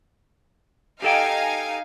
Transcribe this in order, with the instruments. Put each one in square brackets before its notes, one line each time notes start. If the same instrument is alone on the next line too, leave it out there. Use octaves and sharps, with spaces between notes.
[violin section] D#4 F5 G#5 [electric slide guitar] G4 A4 G5